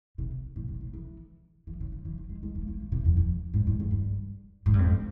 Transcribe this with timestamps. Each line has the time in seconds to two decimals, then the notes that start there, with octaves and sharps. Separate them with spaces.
0.18 C3
0.56 A#2
0.68 C3
0.81 C#3
0.93 E3
1.67 E3
1.81 C#3
1.92 C#3
2.05 E3
2.18 F3
2.29 G#3
2.43 G#3
2.55 A#3
2.68 A#3
2.80 G#3
2.92 C3
3.05 F2
3.17 F2
3.54 G#2
3.67 G2
3.80 F2
3.91 G2
4.66 G#2
4.74 G2
4.79 F2